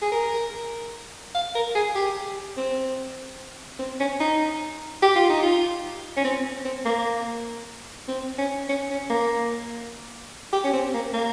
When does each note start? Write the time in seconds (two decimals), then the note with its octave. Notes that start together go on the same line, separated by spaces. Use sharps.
0.02 G#4
0.12 A#4
1.35 F5
1.55 A#4
1.75 G#4
1.96 G4
2.57 C4
3.79 C4
4.00 C#4
4.20 D#4
5.02 G4
5.15 F4
5.30 D#4
5.43 F4
6.17 C#4
6.24 C4
6.65 C4
6.86 A#3
8.08 C4
8.38 C#4
8.69 C#4
8.90 C#4
9.10 A#3
10.53 G4
10.64 C#4
10.73 C4
10.94 A#3
11.14 A#3